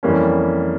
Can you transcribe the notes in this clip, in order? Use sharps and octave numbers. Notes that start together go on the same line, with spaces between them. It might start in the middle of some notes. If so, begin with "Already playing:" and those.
F2 E3 G3 A#3 C#4